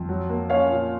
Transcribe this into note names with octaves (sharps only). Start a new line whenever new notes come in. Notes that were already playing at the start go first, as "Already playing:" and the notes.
Already playing: F2
F#3
A#3
C#4 C#5 F5
A#2